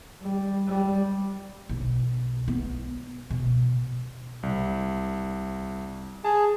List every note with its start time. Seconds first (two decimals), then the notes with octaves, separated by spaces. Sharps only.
0.22 G3
0.67 G3
1.69 B1
2.48 B3
3.30 B2
4.43 C2
6.24 G#4 A5